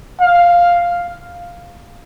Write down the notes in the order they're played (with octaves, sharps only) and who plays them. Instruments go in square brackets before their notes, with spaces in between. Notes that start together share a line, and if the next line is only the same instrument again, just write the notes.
[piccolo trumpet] F5